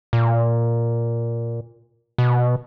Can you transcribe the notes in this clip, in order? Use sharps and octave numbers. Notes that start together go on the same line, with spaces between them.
A#2
B2